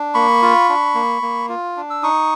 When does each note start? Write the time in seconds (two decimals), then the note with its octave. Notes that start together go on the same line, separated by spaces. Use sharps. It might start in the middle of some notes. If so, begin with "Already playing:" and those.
Already playing: D4
0.14 A#3 B5 C#6
0.42 F4
0.69 D4
0.95 A#3
1.22 A#3
1.49 F4
1.77 D4
1.90 E6
2.03 D#4 C#6 D#6